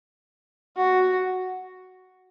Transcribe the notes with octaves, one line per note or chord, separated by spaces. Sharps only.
F#4